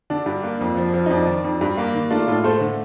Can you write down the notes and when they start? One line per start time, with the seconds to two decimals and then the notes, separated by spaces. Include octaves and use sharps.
0.10 D3 D4
0.26 G2
0.43 A#3
0.61 F2
0.77 F3
0.94 F3
1.06 D#4
1.10 F2 D4
1.27 D#3
1.44 F2
1.61 G2
1.77 A#3
1.94 D#3
2.11 A3 D4 F4
2.27 A2 F4 A4
2.44 A3 A4 C5
2.61 D3